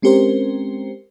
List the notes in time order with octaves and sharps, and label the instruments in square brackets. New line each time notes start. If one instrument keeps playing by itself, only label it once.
[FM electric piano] G#3 C4 C#4 G4 A#4 C5